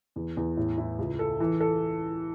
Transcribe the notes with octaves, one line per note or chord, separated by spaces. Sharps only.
E2
E2
A2
E4
C#2
A4
E3
A4